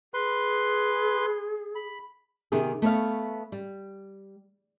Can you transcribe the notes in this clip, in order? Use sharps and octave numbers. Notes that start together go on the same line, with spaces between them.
G#4 B4 C6
B5
C3 D#3 B3 G4 G#4
A3 B3 C#5 F5
G3